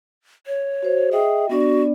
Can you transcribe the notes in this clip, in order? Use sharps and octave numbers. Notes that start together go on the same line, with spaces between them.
C#5
F#4 C5
G#4 D#5 E5 G5
B3 D4 F#4 D5